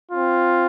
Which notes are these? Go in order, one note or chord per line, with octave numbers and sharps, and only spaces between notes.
C4 F4